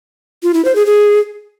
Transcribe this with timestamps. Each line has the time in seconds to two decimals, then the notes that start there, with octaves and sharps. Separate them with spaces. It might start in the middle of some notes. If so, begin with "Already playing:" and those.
0.43 F4
0.54 E4
0.65 C5
0.76 G#4
0.86 G#4